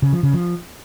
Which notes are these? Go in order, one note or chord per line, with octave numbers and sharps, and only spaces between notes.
C#3
F3
C#3
F3